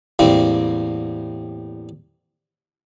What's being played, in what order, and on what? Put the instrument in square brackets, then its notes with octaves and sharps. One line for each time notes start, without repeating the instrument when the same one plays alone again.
[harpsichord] E2 A2 G3 A#3 C4